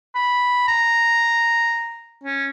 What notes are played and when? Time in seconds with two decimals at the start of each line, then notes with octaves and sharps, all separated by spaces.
0.15 B5
0.68 A#5
2.24 C#4